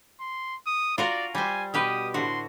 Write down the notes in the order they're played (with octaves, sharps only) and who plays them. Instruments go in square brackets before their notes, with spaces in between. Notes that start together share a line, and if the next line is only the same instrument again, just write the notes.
[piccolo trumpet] C6
D#6
[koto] F4 F#4 A#4 [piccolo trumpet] D5
[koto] G3 C5 [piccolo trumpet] G#5
[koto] B2 G4 B4 [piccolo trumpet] D#6
[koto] A2 D3 F#4 [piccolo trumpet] C6